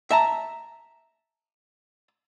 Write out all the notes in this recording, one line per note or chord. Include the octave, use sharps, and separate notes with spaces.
E5 A5 A#5